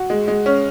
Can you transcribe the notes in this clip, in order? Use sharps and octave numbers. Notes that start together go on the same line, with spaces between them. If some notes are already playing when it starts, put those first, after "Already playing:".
Already playing: F#4
G#3
G#3
C#4